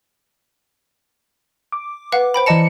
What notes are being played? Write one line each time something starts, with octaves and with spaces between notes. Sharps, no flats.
D6
B4 F5 F#5
C5 G5 B5
E3 D5 D#5 A5 A#5 C#7